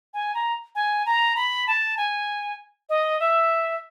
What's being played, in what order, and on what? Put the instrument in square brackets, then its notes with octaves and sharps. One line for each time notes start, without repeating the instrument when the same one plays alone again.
[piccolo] G#5
A#5
G#5
A#5
B5
A5
G#5
D#5
E5